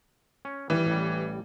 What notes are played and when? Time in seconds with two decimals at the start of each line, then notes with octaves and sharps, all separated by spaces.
0.45 C#4
0.70 E3 G3
0.86 A1 G3